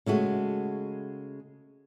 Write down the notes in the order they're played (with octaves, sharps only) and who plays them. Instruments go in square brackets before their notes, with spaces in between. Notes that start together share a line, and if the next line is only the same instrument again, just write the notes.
[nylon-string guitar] C#3 G#3 A3 F#4